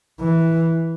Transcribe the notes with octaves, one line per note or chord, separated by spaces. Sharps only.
E3